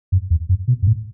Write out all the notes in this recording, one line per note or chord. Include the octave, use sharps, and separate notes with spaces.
F#2
E2
F#2
B2
F#2
A2